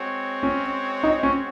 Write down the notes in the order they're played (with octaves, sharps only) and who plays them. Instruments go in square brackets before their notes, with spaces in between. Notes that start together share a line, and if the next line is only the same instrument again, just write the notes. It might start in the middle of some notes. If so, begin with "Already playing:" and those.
Already playing: [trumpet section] G#3 C4 F#4 C#5
[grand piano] C#4
D#4
C#4